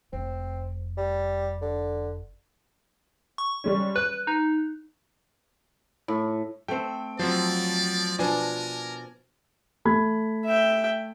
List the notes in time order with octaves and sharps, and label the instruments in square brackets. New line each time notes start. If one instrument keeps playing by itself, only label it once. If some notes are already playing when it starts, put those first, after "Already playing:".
[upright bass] F1 [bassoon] C4
[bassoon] G3
D3
[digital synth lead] C#6
[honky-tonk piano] G3 G#3 C#4
[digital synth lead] B4 [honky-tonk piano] F#6
[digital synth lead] D#4
[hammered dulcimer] A2
[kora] A3 C4 [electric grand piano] G5
[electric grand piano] F3 F#3 C4 [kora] C5 [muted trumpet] D5
[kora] B2 F3 D4 [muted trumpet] A#4 [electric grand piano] D5 G#5
[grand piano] A3 B5 G#6
[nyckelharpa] E5 G5